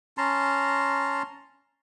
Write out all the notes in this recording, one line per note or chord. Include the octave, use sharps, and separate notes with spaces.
C#4 A5 A#5 C6